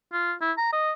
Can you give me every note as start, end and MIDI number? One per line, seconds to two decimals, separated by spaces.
0.12 0.33 65
0.41 0.52 64
0.57 0.70 82
0.72 0.93 75